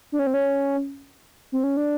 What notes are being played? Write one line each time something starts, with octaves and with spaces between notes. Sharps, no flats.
D4
C#4
C4
C#4
C4
C#4
D4